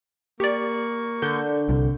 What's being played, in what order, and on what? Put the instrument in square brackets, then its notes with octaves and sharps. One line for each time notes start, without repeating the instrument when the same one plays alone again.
[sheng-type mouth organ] A#3 C#6 [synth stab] G4 D5
[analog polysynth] D3 [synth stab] G6
[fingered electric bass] C2 C3